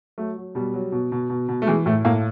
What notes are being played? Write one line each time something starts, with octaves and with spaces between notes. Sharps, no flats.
F#3 A3
F#3
B2 G3
F#3
B2
B2
B2
B2
A3
E3 G#3
A2 A3
A2 A#3